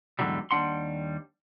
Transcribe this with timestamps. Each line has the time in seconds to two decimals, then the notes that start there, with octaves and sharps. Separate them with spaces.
0.19 E2 G#2 D3 D#3 F#3 G3
0.51 D#2 G3 D4 F#5 C6